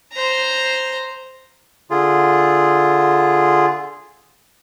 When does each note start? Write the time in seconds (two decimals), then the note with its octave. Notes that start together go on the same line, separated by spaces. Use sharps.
0.13 C5 A#5
1.90 D3 F4 G#4